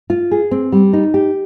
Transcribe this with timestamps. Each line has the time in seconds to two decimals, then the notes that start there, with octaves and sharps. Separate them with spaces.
0.10 F4
0.31 G#4
0.51 C4
0.72 G3
0.93 D#4
1.14 G4